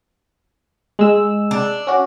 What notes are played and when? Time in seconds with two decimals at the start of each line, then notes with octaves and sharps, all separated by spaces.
0.99 G#3 E6
1.51 D4
1.87 C#4 F#4